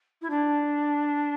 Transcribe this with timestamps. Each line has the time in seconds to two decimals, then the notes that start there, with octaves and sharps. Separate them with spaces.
0.21 E4
0.30 D4